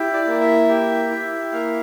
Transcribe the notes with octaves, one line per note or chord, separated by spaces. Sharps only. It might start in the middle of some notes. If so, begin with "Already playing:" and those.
Already playing: E4 G4
D5
A#3
E5
G4
E4
A#3 F5